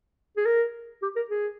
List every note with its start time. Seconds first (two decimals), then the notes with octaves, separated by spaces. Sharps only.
0.37 G#4
0.46 A#4
1.02 G4
1.16 A#4
1.30 G#4